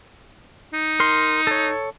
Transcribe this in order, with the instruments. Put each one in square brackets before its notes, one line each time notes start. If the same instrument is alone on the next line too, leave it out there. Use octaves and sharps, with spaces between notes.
[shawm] D#4
[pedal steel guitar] A#4 C6
A4 C#5